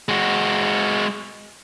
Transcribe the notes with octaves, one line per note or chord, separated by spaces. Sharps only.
G#3 F#4